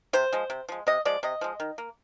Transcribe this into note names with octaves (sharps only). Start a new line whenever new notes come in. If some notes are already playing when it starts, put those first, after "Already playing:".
C3 C5
F3 G#3
C3
F3 G#3
C3 D#5
F3 G#3 D5
C3 D#5
F3 G#3
D#3
A#3